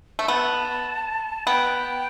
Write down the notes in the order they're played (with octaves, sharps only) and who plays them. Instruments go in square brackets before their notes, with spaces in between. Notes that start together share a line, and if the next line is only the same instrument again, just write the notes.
[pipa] A3
[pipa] B3 [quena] A5
[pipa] B3 [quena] G5